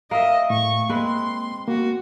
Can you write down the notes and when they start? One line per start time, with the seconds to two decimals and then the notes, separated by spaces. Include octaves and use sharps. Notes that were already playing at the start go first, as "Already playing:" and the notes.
0.11 A#3 D#5 E5
0.50 A2 C#6
0.90 G#3 A#3 C4 B4 C6
1.68 A#3 F#4